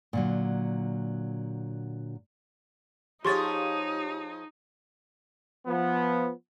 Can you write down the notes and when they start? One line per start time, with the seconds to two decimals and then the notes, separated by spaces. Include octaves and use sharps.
0.13 A#2 D3 F#3
3.25 F3 D#4 G4 G#4 C#5 C6 C#6 A6
5.66 F3 B3